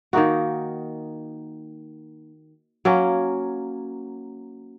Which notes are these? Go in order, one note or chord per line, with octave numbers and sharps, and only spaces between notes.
D#3 A#3 D#4 F#4
F#3 A#3 C#4